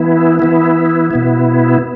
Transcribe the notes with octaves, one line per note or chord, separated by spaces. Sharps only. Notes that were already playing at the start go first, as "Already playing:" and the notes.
Already playing: E3 B3 E4
E3 B3 E4
B2 B3 E4